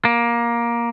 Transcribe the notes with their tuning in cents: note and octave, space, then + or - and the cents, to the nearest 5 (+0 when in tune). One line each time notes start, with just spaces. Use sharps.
A#3 +15